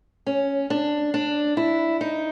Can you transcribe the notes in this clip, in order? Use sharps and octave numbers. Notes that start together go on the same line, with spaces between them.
C#4
D4
D4
E4
D#4